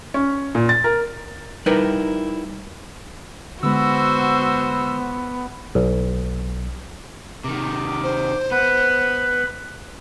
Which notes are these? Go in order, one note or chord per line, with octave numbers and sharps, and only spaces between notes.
C#4
A#2
A6
A#4
G3 D#4 E4 A#4 B4 D5
D3 G#3 B3 F#4 C5 E6
B1
C3 D#3 D6
C5
B3 B4 B5